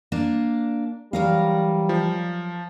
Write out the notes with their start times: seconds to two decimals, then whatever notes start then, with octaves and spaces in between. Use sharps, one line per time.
0.12 A#3 D4
1.13 E3 F#3 G3 A#4 F5
1.89 F3